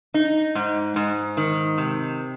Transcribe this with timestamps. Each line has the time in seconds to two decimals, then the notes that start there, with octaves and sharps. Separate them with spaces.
0.14 D#4
0.55 G#2
0.96 G#2
1.37 D#3
1.78 C3